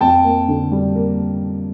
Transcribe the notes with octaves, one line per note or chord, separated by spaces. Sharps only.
F2 G5 A5
A#3
D3
G3
A#3